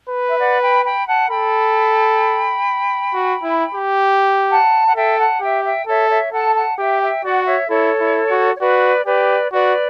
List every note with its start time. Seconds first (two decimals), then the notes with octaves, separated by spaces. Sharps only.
0.09 B4
0.29 E5
0.39 D5 F#5
0.61 G5 B5
0.84 G5 B5
1.07 F#5 A5
1.30 A4 G5 B5
3.13 F#4
3.43 E4
3.74 G4
4.50 F#5 A5
4.85 F#5
4.95 A4 E5 G5
5.19 F#5 A5
5.41 G4 E5 G5
5.64 E5 G5
5.86 A4 C#5 E5
6.09 C#5 E5
6.32 A4 F#5 A5
6.55 F#5 A5
6.78 G4 E5 G5
7.01 E5 G5
7.24 F#4 D5 F#5
7.46 C#5 E5
7.69 E4 A4 C#5
8.00 E4
8.31 F#4
8.55 C#5
8.61 F#4 B4 D5
9.06 G4 B4 D5
9.52 F#4 B4 D5